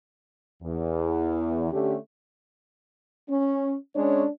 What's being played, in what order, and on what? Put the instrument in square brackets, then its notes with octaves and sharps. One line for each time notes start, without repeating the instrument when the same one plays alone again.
[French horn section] E2
D3 A3 C#4 G4
C#4
[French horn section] G#3 C#4 C#5 [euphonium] D4